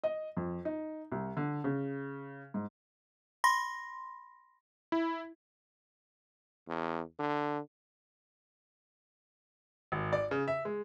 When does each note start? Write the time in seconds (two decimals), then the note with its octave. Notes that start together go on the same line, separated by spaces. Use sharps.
0.04 D#5
0.37 F2
0.65 D#4
1.12 C2
1.37 D3
1.64 C#3
2.54 G#2
3.44 B5 C6 A#6
4.92 E4
6.68 E2
7.19 D3
9.92 G#1
10.13 D5
10.31 C#3
10.48 E5
10.65 G#3